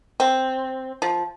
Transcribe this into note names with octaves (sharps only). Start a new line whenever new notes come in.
C4
F3